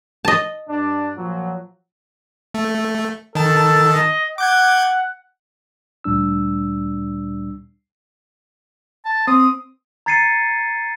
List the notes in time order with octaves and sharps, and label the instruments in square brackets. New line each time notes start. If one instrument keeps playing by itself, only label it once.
[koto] D#5 A5
[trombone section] G2 D4
A#2 F3 F#3
[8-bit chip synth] A3
[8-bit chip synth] D#3 A5 [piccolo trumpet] A4
[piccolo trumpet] D#5
[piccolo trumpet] F#5 [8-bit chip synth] D6 G6 G#6
[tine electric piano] D2 A#2 G3 D4 E6
[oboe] A5
[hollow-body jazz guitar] C4 [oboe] D#6
[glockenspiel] A#5 G#6 A6 C7 C#7 D#7